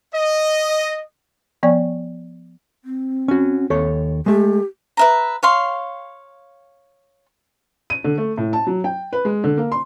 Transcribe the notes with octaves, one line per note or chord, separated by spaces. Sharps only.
D#5
F3 B3 D5 G#5 C#6
C4
C#4 F#4
D#2 A4 C#5
G#3 A3 G4
B4 E5 A#5
C#5 F5 C6
D#7
D3
A3
A2
A5
F#3
G5
B4
G#3
D3
A#3
C6